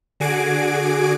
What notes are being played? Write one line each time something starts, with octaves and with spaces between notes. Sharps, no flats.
D3 F#4 G#4 G#5 D6 D7